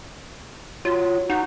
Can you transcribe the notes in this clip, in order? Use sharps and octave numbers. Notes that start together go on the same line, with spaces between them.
F#3 F4
D#4 F#4